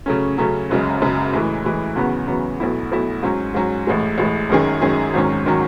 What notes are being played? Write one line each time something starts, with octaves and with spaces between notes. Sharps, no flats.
C#3 F#3 A3 C#4
C#3 F#3 A3 C#4
F#1 F#2 C#3 G#3
F#1 F#2 C#3 G#3
A2 E3 G#3
A2 E3 G#3
E2 C#3 F#3 B3
E2 C#3 F#3 B3
B1 B2 A3 E4
B1 B2 A3 E4
G#2 F#3 C#4
G#2 F#3 C#4
A1 A2 G#3
A1 A2 G#3
F#2 D#3 G#3 C#4 G#4
F#2 D#3 G#3 C#4 G#4
G#1 G#2 D#3 F#3 C#4
D#3 F#3 C#4